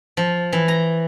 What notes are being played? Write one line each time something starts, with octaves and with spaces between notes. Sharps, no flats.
F3
E3
A#5